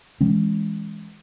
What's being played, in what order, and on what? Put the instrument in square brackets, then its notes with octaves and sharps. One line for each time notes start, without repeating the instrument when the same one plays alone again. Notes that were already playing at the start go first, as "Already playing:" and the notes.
[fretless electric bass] E3 G#3 C#4